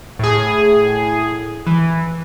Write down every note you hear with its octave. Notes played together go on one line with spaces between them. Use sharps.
A2 G#4
E3